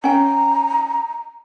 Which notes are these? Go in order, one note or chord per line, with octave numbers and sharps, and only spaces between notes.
C#4 G5 A#5